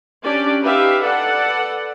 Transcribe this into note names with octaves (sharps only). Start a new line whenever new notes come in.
C#4 D4 G4 D5
D#4 G4 B4 E5 F5
A4 B4 D5 F#5